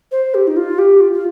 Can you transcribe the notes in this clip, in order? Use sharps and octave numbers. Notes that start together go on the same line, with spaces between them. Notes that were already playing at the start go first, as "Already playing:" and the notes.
C5
G4
D#4
F4
G4
F4
F4